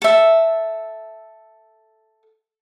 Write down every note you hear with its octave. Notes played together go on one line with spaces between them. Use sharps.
A4 E5